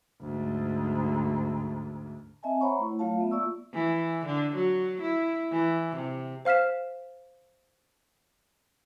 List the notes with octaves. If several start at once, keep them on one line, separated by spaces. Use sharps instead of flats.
D2 G#2
C4 D#5 E5 G#5 A5
C5 C#5 F#5 A#5 B5 C#6
A3 E4
F#3 A3 F4 C#5 F5 A5
B3 E5
A#3 F4 D5 C#6 E6
E3
D3
F#3
E4
E3
C3
C5 F5 F6 B6 E7